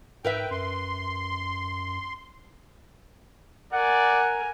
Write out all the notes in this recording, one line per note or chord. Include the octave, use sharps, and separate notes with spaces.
G#2 A#4 B4 E5 G5
F#2 C6
A#4 D5 F#5 G#5